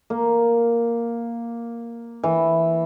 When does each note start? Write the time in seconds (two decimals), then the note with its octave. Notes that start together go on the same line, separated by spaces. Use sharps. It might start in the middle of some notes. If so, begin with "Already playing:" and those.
0.10 A#3
2.23 E3